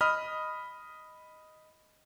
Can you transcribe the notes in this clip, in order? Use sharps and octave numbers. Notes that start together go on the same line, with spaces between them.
D#5 B5 D#6 F6